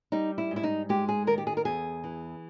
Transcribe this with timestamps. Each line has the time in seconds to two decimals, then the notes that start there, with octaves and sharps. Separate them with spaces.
0.12 G3 D#4
0.38 E4
0.51 G#2
0.56 E4
0.63 D#4
0.89 G#3 G4
1.09 G#4
1.27 D#3 A#4
1.38 G4
1.47 G#4
1.57 A#4
1.65 E2 G#4
2.04 E3